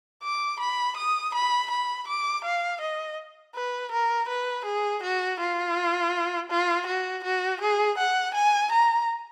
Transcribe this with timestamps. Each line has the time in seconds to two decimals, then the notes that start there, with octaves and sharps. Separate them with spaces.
0.23 D6
0.60 B5
0.97 D#6
1.34 B5
1.71 B5
2.08 D6
2.44 F5
2.81 D#5
3.55 B4
3.92 A#4
4.28 B4
4.65 G#4
5.03 F#4
5.40 F4
6.50 F4
6.87 F#4
7.24 F#4
7.61 G#4
7.98 F#5
8.35 G#5
8.72 A#5